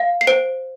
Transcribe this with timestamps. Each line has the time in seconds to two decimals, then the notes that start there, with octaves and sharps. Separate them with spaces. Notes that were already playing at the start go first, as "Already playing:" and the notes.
Already playing: F5
0.21 C7
0.27 C5 D7